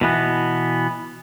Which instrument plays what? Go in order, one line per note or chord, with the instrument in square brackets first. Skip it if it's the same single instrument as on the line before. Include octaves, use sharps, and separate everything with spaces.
[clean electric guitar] B2 E3 B3